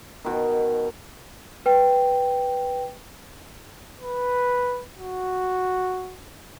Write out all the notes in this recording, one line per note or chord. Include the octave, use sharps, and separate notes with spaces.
B2 D#3
B4 G5
B4
F#4